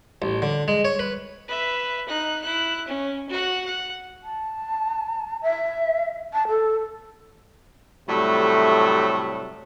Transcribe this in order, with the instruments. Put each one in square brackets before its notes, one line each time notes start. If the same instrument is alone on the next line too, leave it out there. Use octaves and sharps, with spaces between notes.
[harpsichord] A1
D3
G#3
C#5
B4
[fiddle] B4 E5
D#4 F#6
E4 F#6
C#4
F#4 F#5
F#5
[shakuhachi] A5
E5
A5
A4
[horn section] A2 C3 F#3 G3 A3